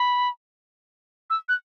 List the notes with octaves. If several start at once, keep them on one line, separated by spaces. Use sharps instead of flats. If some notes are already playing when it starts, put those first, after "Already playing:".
Already playing: B5
E6
F#6